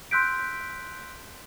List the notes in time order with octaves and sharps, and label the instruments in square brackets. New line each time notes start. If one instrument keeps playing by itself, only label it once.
[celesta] C6 E6 F#6 G6 B6 D7